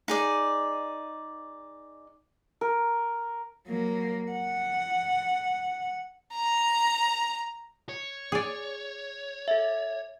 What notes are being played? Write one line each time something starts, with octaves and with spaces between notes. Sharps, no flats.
D#4 G#4 D5
A#4
F#3 A#3
F#5
A#5
C#5
G#4 D5
A4 E5